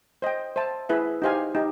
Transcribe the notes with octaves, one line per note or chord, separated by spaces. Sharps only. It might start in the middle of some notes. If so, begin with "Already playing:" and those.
C5 D#5 G5
C5 E5 A5
E4 G#4 B4 E5
D#4 G4 C5 F5 G#5
D#4 G4